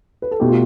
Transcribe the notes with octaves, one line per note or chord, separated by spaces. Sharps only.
B4
A4
B2 A3 G4
F4